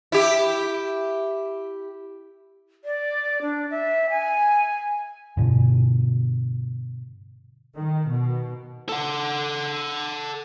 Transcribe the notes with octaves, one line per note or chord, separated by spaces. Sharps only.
E4 G4
D5
D4
E5
G#5
G2 B2 D3
D#3
B2
A4 F#5